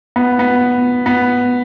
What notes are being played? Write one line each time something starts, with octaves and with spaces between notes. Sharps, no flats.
B3
B3
B3